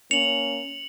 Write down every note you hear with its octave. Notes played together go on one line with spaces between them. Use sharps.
A#3 C#4 C#7 F7 F#7